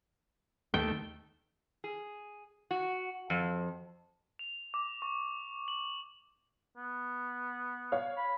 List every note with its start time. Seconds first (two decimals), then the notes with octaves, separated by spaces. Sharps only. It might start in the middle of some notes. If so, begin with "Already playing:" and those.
0.74 D#2 A3 G5
1.84 G#4
2.71 F#4
3.30 F2
4.39 F7
4.74 D6
5.02 C#6
5.68 F#7
6.77 B3
7.92 C#5 F5
8.17 B5